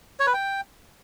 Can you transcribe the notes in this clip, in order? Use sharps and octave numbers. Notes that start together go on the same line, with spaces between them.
C#5
B4
G5